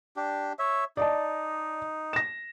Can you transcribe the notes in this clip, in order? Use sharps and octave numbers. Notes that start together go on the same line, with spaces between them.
D4 G4
C#5 E5
D#4 D5 D#5 A5
A#6 E7